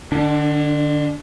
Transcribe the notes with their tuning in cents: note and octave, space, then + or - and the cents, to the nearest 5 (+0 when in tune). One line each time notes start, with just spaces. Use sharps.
D3 +35 D4 -15